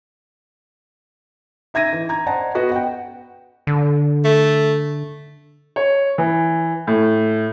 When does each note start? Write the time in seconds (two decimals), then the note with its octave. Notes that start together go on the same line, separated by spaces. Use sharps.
1.74 D#4 E5 G#6 A#6 D#7
1.93 E3
2.09 A#5 G#6
2.26 C5 D5 D#5 F#5 A5 A#5
2.55 B3 F#4 B4 D#5
2.72 F#5 G5
3.67 D3
4.24 A3
5.76 C#5
6.18 E3
6.87 A2